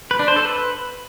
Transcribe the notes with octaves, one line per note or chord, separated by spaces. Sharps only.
B4
D4
C5
A4
B4